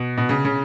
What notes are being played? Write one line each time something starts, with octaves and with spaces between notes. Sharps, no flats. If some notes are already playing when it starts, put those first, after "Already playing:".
Already playing: B2
B2
C#3
C#3